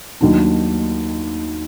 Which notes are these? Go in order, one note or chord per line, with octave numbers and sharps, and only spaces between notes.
D#2 D#3 F#3 D4